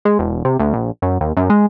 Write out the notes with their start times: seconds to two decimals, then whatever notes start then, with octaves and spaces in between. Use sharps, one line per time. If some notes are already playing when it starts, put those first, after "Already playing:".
0.05 G#3
0.19 E1
0.45 C3
0.59 D2
0.74 A#1
1.02 F#2
1.21 D#2
1.37 F#2
1.50 G#3